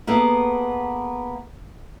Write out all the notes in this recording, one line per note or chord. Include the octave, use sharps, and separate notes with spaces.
A#3 B3 G#4 A4